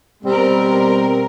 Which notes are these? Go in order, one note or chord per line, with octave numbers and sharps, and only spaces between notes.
B2 G3 C4 A#4